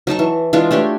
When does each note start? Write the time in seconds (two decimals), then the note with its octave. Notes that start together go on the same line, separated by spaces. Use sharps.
0.07 F#3 D#4 A5 C#6
0.19 E3
0.53 E3 G#3 D4 F4
0.71 A3 D4 G4 C#5